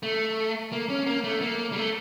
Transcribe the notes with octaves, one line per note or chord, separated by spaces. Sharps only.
A3
A#3
C#4
A#3
A3
A#3
G3
A3